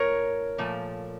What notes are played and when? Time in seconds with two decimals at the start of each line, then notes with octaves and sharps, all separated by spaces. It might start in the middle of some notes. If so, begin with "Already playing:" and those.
Already playing: A2 A#4 C#5
0.58 A#2 F3 A3